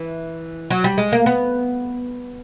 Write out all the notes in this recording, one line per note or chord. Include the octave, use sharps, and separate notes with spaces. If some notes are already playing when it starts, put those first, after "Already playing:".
Already playing: E3
F#3
G3
G#3
A#3
B3